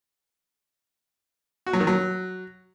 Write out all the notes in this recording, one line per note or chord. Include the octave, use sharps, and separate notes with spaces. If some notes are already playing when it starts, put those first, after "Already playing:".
F#4
F#3
D#3
F#3